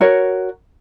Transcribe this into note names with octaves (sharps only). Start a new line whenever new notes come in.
F#4 A#4 C#5